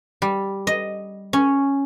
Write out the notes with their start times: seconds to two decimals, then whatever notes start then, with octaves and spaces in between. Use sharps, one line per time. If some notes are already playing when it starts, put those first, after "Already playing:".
0.22 G3
0.67 D#5
1.33 C#4